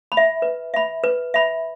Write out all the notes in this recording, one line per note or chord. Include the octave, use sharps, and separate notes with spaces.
B5
E5
B4
E5 B5
B4
E5 B5